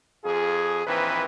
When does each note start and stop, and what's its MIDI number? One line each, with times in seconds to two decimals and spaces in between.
0.25 0.84 41
0.25 0.84 65
0.25 0.84 68
0.86 1.24 34
0.86 1.24 51
0.86 1.24 52
0.86 1.24 60
0.86 1.24 71